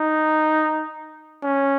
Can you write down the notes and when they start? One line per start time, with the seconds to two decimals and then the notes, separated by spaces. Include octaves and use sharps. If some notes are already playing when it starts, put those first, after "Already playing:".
Already playing: D#4
1.43 C#4